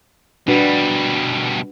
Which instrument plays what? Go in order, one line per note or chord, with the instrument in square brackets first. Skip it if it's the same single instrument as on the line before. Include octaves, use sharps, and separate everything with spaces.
[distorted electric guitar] B2 G3 [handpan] D4 F#4 B4